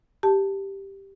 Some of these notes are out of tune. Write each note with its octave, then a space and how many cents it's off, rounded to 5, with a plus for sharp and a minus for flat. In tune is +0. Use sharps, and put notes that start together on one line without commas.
G4 +0 A5 +5